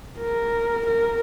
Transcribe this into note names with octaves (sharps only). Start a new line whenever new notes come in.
A#4
A#4